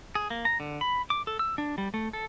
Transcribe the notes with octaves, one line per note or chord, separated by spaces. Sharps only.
G#4
A#3
A#5
D3
B5
D6
A4
E6
D4
G3
A3
A4